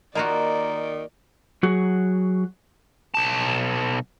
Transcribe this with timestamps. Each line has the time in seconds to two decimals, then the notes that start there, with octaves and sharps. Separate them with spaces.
0.15 D#3 A#3 F4 F#4 D5 D#5 A#5
1.63 F#3 F#4 G#4
3.15 B1 A5